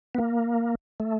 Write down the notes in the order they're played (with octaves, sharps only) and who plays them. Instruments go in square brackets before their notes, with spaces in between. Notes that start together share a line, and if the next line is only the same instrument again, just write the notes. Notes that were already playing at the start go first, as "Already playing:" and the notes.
[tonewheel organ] B3
A#3
A3